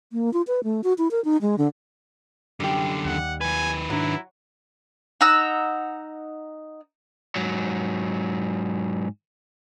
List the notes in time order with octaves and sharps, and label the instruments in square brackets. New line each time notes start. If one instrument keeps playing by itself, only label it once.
[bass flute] A#3
F4
B4
A3
F#4
E4
A#4
D#4
G#3
D3
[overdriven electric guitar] F#2 D3 [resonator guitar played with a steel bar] G3 G4
[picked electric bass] D#2 [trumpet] F#5
[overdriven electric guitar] D#3 B4 [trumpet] G#5
[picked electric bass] G#2 D4 [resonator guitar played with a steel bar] F#3 [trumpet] E4
[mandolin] D#4 F#5 A#5 E6
[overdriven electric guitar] G#2 F#3